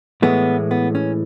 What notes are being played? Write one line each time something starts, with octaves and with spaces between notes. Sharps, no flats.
A2 E3 G#3 B3
B3
C#4